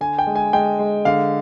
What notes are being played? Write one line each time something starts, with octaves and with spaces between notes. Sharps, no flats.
D3 G#5
G5
G#3
G#5
G#3 G5
G#3
D3 F5